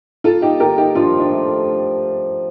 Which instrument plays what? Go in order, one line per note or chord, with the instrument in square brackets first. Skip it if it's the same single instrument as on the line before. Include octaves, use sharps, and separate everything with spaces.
[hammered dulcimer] A#3 [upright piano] F4 A4
[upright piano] D#4 G4
[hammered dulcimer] D#3 [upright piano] G4 A#4
[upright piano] D#4 G4
[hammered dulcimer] F3 [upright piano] D4 F4
[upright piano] D4
[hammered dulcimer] A3